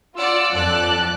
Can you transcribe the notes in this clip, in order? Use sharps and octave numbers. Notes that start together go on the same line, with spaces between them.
F4 D5 F#5 E6
F2 A4 D5 A5 F#6